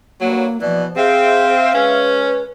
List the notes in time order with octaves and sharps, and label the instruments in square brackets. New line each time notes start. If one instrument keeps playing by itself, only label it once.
[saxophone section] G2 F#3 [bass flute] A#3
[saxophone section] B2 E3 [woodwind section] F3 [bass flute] D5
[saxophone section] C4 [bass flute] G#4 [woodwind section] E5 F5
[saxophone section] G#3 C#4 [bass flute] B4